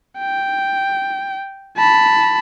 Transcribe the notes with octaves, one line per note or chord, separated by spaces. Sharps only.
G5
A5 B5